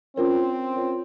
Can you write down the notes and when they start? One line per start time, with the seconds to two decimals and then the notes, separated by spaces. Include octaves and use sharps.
0.16 C4 C#4 F4 A#4 C#5
0.75 C#4 F4 A#4 C#5